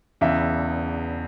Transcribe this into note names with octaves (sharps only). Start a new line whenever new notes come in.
E1 E2 C#3 E5